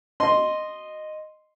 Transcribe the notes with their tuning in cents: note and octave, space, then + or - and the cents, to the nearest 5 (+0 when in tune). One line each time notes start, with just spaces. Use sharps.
D#5 -10 C6 +0